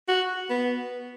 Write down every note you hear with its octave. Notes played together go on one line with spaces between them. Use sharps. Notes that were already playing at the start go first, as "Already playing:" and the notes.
F#4
B3